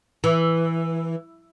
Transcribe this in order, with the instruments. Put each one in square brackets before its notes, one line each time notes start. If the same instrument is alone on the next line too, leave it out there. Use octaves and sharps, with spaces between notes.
[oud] E3